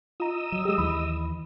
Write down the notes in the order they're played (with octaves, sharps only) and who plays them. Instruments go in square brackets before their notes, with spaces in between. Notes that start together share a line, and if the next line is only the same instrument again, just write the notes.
[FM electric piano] F4 A#5 [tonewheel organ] D#5 D#6 E6
[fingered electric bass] F#3
[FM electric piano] G#3 G4
[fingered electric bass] D#2 E3 [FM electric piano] B5